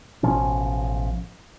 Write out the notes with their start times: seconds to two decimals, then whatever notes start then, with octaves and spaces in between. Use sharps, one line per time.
0.23 A1 B2 F3 C#4